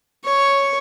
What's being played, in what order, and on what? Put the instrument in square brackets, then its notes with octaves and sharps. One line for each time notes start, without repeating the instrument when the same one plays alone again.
[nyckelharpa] C#5